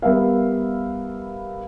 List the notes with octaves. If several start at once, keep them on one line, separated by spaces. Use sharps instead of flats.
G3 B3 A#4 E5 F5